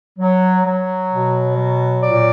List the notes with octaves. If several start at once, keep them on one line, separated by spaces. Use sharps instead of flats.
F#3
F#3
B2
F#3
A#2 D5